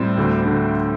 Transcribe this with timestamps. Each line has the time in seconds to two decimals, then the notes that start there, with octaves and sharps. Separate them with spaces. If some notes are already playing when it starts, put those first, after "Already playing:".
Already playing: A2 G3 C4
0.17 D2 D3
0.45 D3